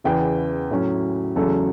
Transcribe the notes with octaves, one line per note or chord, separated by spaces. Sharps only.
E2 C#3 E3 B3 G5
A2 F#3 C#4
E2 C#3 F#3 A3 C#4 A4